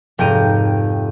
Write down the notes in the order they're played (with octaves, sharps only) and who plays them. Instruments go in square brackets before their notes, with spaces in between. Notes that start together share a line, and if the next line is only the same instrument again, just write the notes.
[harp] F1 G#2 G5 A#5 D#7